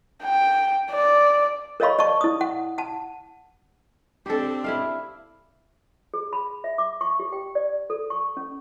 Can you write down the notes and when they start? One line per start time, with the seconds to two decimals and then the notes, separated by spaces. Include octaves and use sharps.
0.23 G5
0.91 D5
1.80 A#4 C#5 D#5 F5 B5 C#6
1.99 D5 D#5 A5 C#6
2.21 E4 D#6
2.41 F#5
2.78 F#5 A5
4.26 C4 D4 G4 A4
4.64 E4 E5 F5
6.14 G#4
6.33 B5
6.64 E5
6.78 D6
7.01 C#6
7.20 G4
7.32 G5
7.55 D5
7.90 A4
8.10 C#6
8.37 C#4